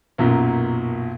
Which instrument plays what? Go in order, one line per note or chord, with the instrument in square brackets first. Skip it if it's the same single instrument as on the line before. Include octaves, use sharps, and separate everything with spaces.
[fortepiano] B1 F#2 A#2